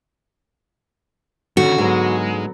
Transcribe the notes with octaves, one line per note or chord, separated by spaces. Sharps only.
D3 D#3 C#4 F#4
G#2 D3 F#3 G#3 B3